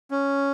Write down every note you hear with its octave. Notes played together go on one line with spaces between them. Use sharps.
C#4